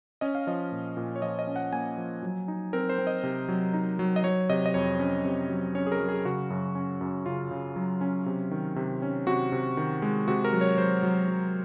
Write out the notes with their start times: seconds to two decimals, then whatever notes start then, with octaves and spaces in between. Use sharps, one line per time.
0.21 C#4 D#5
0.35 F5
0.47 F3 D#5
0.72 A#2
0.97 A#2
1.16 C#5
1.22 F3 D#5
1.39 D#5
1.47 C#4
1.56 F#5
1.73 A#3 G#5
1.98 F3
2.23 F#3
2.48 D#4
2.73 C4 A#4
2.89 C5
2.98 C4
3.07 D#5
3.23 C3
3.48 F#3
3.74 D#4
3.99 F#3
4.16 D#5
4.24 F#3 C#5
4.49 C3 D#5
4.66 D#5
4.74 F2 C#5
4.99 C#4
5.25 C3
5.49 F#3
5.75 C#4 C#5
5.87 G#4
5.92 A#4
6.00 F#3
6.09 G#4
6.25 C#3 F#4
6.50 F#2
6.75 C#4
7.01 F#2
7.26 C#3 F4
7.51 C#3
7.76 F#3
8.01 C#4
8.26 C3
8.51 D#3
8.76 C3
9.02 C#4
9.27 C3 F#4
9.52 C3
9.77 D#3
10.02 G#3
10.28 C3 F#4
10.44 A#4
10.53 F#3
10.61 C#5
10.78 F#3 C5
11.03 F#3
11.28 F#3